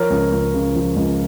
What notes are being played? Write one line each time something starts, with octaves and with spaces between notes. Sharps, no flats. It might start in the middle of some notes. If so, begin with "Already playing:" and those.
Already playing: F3 A#4 C#5
C#2
C#2
C#3
F3
C#2